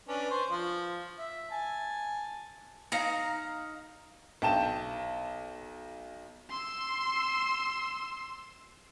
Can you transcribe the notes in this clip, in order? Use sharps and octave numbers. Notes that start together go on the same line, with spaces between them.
C#4 D4 B4
C5 C#6
F3
E5
G#5 A5
D#4 F5 A#5
B1 G5 A5 E7
C6 E6